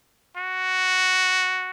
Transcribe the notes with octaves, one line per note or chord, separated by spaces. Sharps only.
F#4